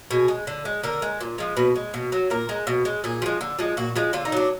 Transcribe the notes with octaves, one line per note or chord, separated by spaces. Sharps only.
B2 G#4
G#3
D3
G#3
D3 A#4
G#3
A#2
F3 G#3
B2 B4
G#3
B2
F#3
A#2 A#4
G#3
B2
G#3
A#2 G#4
F3 G#3
D3
F3 G#3
A#2 F#4
F3 G#3
D3 F4
D#4
F#3 D4